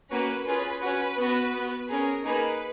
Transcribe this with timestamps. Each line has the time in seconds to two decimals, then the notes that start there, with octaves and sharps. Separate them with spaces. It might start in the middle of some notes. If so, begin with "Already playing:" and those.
0.11 A#3 C#4 F#4 B4
0.46 C#4 F4 G#4 B4
0.82 C#4 F#4 B4
1.17 B3 F#4
1.53 B3 F#4
1.88 C#4 G#4 A#4
2.24 A#3 D#4 G#4 B4